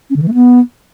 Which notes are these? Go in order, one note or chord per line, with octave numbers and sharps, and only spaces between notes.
C#4
D3
E3
A3
B3